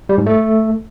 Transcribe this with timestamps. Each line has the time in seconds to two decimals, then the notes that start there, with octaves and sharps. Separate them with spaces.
0.09 G3
0.18 G#2
0.26 A3